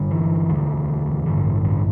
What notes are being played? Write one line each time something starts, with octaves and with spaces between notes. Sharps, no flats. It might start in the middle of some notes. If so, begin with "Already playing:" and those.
Already playing: G1 G2 D3
E3
E1 D2 D3
A1 G2 D3
D3